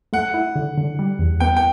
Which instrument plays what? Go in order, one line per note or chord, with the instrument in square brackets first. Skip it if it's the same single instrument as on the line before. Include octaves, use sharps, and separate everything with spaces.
[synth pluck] A3 [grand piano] F#5
[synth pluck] E4
D3
D3
G3
E2
[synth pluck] B3 [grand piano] G5
[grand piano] G5